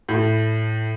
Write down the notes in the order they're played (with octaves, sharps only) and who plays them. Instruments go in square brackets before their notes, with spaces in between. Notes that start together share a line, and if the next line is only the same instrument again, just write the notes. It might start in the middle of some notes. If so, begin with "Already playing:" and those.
[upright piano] A2